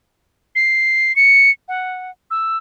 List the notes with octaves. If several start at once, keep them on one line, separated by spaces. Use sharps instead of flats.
C7
C#7
F#5
E6